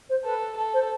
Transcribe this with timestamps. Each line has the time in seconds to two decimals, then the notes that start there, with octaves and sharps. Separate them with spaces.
0.09 C5
0.25 A4 B4
0.57 A4
0.73 C5